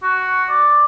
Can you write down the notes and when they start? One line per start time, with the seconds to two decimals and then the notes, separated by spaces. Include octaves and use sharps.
0.03 F#4
0.49 D5